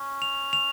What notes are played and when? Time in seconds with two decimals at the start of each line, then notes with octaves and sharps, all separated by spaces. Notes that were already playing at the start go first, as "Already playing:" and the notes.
Already playing: C#4
0.22 F7
0.53 F7